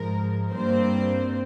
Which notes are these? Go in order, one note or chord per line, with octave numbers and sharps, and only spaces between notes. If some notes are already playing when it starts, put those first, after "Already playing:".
Already playing: G#2 F3 G#3 A#4
G2 G3 A#3 C4 C5